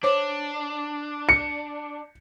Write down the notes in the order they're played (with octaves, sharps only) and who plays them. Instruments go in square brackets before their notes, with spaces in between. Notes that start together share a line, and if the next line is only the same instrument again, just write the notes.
[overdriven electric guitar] D4 [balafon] C5 C#5 D6
[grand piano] C#7